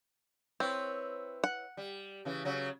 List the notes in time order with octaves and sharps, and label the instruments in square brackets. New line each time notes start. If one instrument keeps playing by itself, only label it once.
[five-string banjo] C4 [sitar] E4 B4 C#5
[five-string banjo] F#5
[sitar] G3
C#3 E3
C#3 F#3